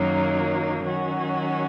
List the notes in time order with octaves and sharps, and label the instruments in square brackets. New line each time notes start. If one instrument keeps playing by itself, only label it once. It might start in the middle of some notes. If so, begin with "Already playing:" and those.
Already playing: [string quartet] F#2 D#3 F#3 A#3 D#4
D#3 F#3 C#4 F#4